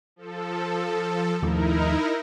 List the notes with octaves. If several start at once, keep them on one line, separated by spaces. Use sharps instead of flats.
F3 A4
D#2 F3 A3 D#4 E4 A#4